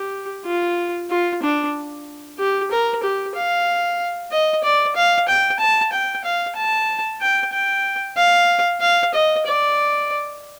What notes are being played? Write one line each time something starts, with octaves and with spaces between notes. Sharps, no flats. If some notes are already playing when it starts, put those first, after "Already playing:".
Already playing: G4
F4
F4
D4
G4
A#4
G4
F5
D#5
D5
F5
G5
A5
G5
F5
A5
G5
G5
F5
F5
D#5
D5